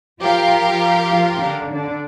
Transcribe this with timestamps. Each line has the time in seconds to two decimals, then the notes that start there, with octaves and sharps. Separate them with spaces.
0.20 F3 F4 G4 A#4 F5
0.66 F3 F4
1.11 F3 F4
1.41 D3 D4
1.71 D3 D4